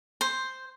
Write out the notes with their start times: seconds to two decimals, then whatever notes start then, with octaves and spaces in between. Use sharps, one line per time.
0.21 C5